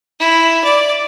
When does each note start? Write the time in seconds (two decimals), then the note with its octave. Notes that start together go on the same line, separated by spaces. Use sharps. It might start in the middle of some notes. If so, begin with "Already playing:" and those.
0.20 E4
0.64 D5